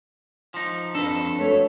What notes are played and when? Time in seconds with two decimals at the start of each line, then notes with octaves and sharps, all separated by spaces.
0.54 F3 D#4
0.95 F2 D4 A4 B4
1.40 F#3 A3 C#5